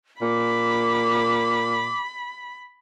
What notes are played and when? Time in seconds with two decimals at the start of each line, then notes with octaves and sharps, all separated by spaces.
0.21 A#2 B5 D6